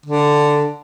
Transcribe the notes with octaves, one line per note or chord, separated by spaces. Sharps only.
D3